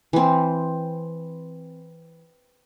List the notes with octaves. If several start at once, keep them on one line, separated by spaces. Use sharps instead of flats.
E3 C4